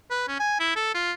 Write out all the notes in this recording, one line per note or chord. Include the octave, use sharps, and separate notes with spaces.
B4
C#4
G#5
E4
A4
F4